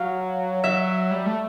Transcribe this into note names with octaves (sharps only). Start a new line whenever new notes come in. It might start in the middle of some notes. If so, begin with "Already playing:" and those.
Already playing: F#3 F5
F#3 E5
G3
A3